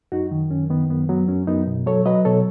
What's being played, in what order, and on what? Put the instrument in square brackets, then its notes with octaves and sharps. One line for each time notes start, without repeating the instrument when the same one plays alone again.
[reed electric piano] F#2 D#4 F#4
D#3
F#2 C#4
D#3 B3
F#2 B3
F#3 B3
F#2 C#4
F#2 B3 D#4
B2
F#3 A4 C#5
F#3 B4 D#5
B2 A4 C#5